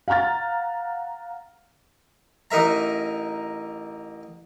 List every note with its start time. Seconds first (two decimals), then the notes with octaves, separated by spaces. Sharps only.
0.08 F5 F#5 A#5 F6 A6
2.51 A1 D#4 A#4 E5 A#5